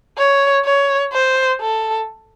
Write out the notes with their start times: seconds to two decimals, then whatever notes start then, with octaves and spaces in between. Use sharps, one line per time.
0.18 C#5
0.65 C#5
1.13 C5
1.60 A4